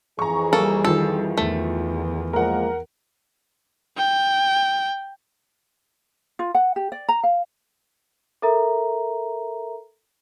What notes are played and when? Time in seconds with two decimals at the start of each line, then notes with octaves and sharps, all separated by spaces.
0.19 F2 E3 G#4 A#5 C#6
0.53 G3 A#3 A4
0.85 D#3 F3 A4
1.38 E2 A3
2.33 F3 G#3 A#3 A#4 F#5
3.97 G5
6.39 F4
6.55 F#5
6.76 G4
6.92 D5
7.09 A#5
7.23 F5
8.42 A4 A#4 E5 A#5